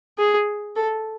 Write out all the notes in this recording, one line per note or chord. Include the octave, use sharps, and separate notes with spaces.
G#4
A4